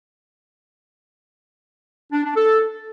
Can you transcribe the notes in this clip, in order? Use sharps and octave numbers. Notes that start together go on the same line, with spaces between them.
D4
D4
A4